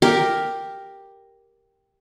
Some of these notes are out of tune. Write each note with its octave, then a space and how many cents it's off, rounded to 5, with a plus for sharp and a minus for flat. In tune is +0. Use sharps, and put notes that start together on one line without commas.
G4 +0 A#4 +0